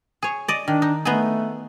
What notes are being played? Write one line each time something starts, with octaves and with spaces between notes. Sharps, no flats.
G#4 C#5
D5 D#5
D#3 D4
D#4
A3 B3 D#4 G#4